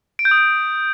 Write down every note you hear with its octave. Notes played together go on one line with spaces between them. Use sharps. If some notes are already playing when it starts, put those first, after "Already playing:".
D7
G6
D#6
D7